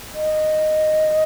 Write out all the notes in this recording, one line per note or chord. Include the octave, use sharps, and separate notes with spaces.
D#5